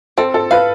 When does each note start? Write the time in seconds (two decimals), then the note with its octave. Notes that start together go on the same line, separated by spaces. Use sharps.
0.18 C4 A4
0.34 A4
0.51 B4 F5